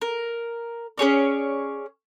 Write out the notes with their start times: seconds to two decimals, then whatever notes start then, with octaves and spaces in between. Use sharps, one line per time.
0.02 A#4
0.98 C#4 G#4 C#5 D5